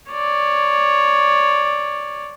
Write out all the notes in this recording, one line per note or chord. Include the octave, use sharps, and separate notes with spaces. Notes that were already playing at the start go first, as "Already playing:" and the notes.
C#5 D5